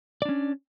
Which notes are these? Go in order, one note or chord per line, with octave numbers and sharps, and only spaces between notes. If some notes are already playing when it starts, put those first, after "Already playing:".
C#4 D4 D5